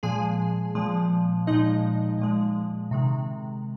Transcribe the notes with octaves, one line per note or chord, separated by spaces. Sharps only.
A#2 F3 G#3 G#4 G#5
A#2 F3 G#3
A#2 F3 G#3 D#4 D#5
A#2 F3 G#3
C3 D#3 G#3